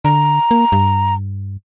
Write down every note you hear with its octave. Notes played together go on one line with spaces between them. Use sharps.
D3 A#5
A#3
G2